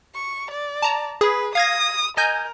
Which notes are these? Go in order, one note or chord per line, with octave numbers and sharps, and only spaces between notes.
C#6
D5
A5 A#5
G#4 B4
F5 D#6 G#6 A#6
A#4 D#5 G#5 G6